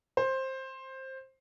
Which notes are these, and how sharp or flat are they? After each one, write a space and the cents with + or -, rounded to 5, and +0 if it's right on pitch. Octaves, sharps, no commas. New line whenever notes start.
C5 +15